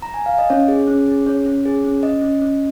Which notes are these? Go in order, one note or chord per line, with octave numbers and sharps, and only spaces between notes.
A#5
G#5
F5
D#5
C#4 C#5
G#4
C#4
G#4
C#4 C#5
C#4
G#4
C#4
C#4 D#5
C#4
C#4